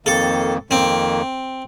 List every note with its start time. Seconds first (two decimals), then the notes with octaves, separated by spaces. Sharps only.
0.06 F2 D#3 A#3 A4
0.70 F2 D#3 A#3 C4